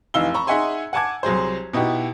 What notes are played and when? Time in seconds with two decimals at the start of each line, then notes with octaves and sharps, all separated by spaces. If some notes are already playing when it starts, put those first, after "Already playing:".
0.14 F1 E3 D#4 F5 E6 G7
0.34 A#5 B5 C#6
0.47 D#4 G#4 E5 F#5 G#5 C6
0.93 F#5 G#5 A5 D6 G#6
1.23 C2 F#3 G#4 C5
1.73 B2 D#4 E4 F#4 G4